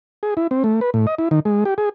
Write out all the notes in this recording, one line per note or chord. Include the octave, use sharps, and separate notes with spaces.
G#4
E4
C4
A3
B4
A2
D#5
E4
D#3
G#3
G4
G#4